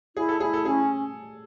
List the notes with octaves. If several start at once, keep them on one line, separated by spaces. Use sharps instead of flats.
E4 G#4
A4
E4 G#4
A4
C#4 G#4